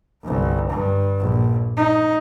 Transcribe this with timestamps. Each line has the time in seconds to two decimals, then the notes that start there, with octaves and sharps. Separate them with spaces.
0.24 G1 C2
0.70 G2
1.20 A#1
1.77 D#4